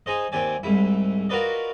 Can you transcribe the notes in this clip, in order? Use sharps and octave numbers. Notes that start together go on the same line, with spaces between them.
D#4 G#4 C5 D#5
D#2 C4 G4 D5 G#5
C2 G#2 E4
F4 F#4 A#4 B4 D5 D#5